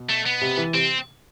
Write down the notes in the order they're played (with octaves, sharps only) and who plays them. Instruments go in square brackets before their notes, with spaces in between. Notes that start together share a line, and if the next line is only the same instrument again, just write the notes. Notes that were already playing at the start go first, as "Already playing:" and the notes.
Already playing: [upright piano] B2
[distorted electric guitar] A3
B3
[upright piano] C3
E3
[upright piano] C3 [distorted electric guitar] C4